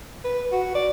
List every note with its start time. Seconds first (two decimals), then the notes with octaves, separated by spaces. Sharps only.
0.24 B4
0.52 F#4
0.75 D5